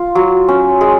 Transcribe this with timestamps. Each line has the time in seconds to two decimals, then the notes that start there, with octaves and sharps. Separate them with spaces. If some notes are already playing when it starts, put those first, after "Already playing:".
Already playing: F4
0.15 F#3
0.48 C#4
0.81 G#3